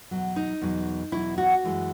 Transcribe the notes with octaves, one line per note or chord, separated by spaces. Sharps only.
E2 B2 F#3
D#4
E2 B2 F#3
E2 B2 F#3 E4
F#4
F#2 E3 G#3